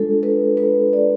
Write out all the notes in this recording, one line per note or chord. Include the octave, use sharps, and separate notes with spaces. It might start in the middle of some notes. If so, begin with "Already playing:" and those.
Already playing: G#3 D4 F4 A4
B4
B4
D5